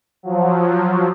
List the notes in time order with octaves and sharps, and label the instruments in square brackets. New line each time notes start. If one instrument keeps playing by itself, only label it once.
[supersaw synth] F3 F#3